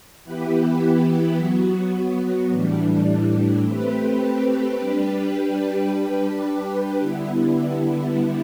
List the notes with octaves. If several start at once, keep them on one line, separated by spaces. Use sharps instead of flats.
E3 B3 E4 G4 B4
F#3 B3 F#4
A2 E3 G3 D4
A3 C4 G4 B4
G3 D4 G4 B4
G3 D4 G4 B4
D3 G3 B3 E4